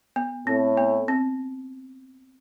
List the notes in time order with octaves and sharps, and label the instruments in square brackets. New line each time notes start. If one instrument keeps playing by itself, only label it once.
[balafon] B3
[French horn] A2 [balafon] C4
[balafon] B3
C4